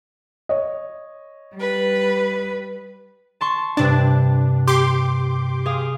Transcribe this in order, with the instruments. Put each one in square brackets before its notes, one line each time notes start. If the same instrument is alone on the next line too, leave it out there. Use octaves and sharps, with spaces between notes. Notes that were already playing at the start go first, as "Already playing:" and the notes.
[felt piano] C#5 D#5
[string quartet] G3 B4
[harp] A5 C6 C#6
[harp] G2 C3 A5 [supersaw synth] D4
[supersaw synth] G4 C6 D6
[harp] G#4 F5 D#6